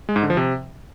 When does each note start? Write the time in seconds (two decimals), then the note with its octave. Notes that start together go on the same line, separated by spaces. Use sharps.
0.09 G#3
0.16 G#2
0.23 D3
0.30 F3
0.37 C3